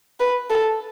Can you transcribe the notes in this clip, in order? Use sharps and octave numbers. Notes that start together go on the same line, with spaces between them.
B4
A4